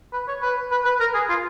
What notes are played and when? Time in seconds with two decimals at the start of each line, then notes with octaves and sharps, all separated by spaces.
0.13 B4
0.28 C#5
0.42 B4
0.71 B4
0.85 B4
1.00 A#4
1.14 G#4
1.29 F4